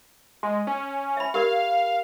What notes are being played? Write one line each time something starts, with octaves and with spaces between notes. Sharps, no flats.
G#3
C#4
E5 B5
G4 A#4 D5 F5